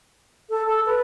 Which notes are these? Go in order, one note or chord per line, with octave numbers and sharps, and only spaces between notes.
A4
A4
B4